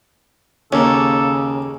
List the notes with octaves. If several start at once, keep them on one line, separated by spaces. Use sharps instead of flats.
D#2 C#3 A#3 C#4 G#4 A4